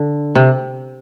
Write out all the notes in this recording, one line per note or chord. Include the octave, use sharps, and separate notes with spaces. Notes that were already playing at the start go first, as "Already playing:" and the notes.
Already playing: D3
C3